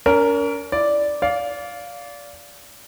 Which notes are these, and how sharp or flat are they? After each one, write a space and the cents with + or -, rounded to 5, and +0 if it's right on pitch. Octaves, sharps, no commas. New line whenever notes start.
C#4 +40 A#4 -5
E4 +15 D5 -5
D5 -25 F5 +5